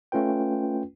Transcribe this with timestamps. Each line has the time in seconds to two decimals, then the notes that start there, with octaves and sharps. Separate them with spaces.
0.12 A3 C#4 F4 B4 G5